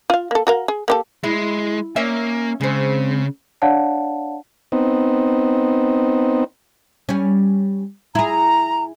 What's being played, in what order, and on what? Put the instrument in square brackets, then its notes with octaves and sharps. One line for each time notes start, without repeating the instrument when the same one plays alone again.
[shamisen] F4 F5
A#3 A4
F#4 A#4 F5
G#4
A#3 G4 A4
[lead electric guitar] G#3 [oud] E4
[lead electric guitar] A#3 [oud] C#4 E5
[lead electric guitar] C#3 [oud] G#3 C4
[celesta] D4 C#5 D5 F5 F#5 A5
[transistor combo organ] B3 C4 D#4
[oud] G3 C#4
[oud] E4 G#4 [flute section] A#5